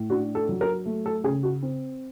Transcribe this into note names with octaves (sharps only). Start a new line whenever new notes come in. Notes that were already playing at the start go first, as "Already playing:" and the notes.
Already playing: A2
D4 F#4
A4
F#3
A#4
A3
A4
C#3 G#4
F#4
C4